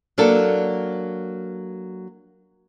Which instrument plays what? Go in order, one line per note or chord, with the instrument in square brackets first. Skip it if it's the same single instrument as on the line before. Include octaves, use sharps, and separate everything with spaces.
[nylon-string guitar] F#3 A#3 D4 A4